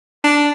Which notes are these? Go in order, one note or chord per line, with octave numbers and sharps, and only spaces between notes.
D4